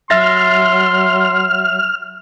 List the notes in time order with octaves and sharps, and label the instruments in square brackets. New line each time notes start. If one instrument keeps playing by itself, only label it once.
[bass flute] F#3 [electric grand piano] E5 A6 A#6 [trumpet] C6 [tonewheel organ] F6